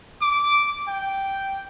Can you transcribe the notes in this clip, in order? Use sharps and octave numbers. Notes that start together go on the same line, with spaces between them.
D6
G5